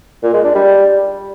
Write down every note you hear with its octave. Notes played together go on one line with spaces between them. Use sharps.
A#2
G#3
D4
G3